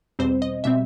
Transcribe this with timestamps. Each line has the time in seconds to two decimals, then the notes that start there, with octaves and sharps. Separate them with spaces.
0.19 E2 B2 G3 C4 C5
0.42 D#5
0.64 B2 G3 C4 E5